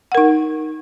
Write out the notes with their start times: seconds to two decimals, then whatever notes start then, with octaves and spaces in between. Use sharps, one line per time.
0.12 F#5
0.15 A#4
0.18 D#4